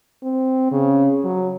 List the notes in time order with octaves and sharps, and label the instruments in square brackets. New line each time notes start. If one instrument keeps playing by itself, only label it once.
[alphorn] C4
C#3
F#3